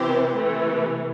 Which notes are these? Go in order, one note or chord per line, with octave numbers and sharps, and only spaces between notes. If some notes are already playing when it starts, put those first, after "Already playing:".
Already playing: C3 E3 C4 G4 C5
C3 E3 A3